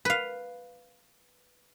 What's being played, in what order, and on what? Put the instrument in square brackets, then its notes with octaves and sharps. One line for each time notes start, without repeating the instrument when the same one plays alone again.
[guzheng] B4 F5